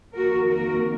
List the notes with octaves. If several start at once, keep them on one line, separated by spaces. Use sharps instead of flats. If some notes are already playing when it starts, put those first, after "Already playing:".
F2 D#3 A#3 F#4 A#4
F#4 A#4